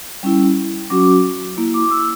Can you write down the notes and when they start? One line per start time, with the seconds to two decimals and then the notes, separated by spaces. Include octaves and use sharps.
0.23 G3 C#4 E4
0.90 F#3 C#4 F#4 D6
1.57 A#3 E4
1.74 D6
1.91 E6